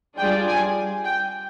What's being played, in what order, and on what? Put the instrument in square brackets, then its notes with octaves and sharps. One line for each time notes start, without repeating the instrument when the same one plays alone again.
[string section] G3 D4 F4 G#4 D5 [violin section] G5
[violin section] G#5
G5